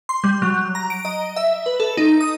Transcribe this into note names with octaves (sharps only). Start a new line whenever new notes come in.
C6
G3
F#3
A#5
D7
D#5
E5
B4
A4
D#4
D#6